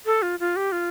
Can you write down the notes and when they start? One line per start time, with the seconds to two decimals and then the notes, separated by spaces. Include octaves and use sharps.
0.06 A4
0.22 F4
0.40 F4
0.56 G4
0.72 F4